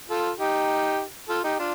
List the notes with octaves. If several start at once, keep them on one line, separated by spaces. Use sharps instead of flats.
F4 A4
D#4 G4
F4 A4
D#4 G4
D4 F4